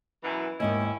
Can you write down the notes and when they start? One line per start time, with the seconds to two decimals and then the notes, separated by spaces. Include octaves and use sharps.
0.24 F#2 B2 E3
0.60 D#2 G#2 D#3 C#4 E4 D#5